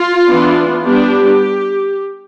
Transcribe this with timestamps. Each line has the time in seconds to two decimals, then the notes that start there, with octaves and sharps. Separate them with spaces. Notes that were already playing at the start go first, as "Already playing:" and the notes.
Already playing: F4
0.28 E3 B3 D4
0.83 G3 B3 D4 G4